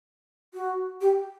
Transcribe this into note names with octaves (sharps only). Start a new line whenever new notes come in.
F#4
G4